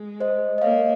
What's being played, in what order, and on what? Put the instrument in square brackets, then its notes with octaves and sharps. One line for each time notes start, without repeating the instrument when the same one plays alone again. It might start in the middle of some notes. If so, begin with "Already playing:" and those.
Already playing: [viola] G#3
[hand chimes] C5 D#5
D#5
[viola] A#3 [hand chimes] C#5 F5